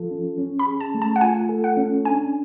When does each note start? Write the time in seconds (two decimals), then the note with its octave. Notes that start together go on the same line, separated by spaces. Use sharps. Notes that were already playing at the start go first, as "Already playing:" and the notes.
Already playing: F3 F4 A4
0.11 C#4
0.38 C#4
0.59 B5
0.67 G#4
0.80 A5
0.94 A3
1.02 A5
1.16 F#5
1.21 F4 G#5
1.49 A4
1.64 F#5
1.77 C#4
2.05 D4 G#5